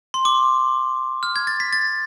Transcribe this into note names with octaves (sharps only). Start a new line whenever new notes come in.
C6
D6
F6
G#6
A6
B6
A6